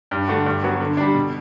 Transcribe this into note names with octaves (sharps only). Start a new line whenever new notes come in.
G2
D3 A3 D4 F#4
G2
F#3 B3 F#4
D3
G3 D4
B2